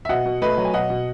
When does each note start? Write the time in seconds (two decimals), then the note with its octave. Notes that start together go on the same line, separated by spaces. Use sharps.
0.05 E5
0.09 B2 D#5 F#5
0.26 B2
0.42 A3 B4 D#5
0.58 F#3
0.65 G#5
0.74 B2 D#5 F#5
0.90 B2